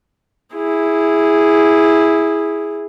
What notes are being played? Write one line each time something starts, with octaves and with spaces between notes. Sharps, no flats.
E4 G#4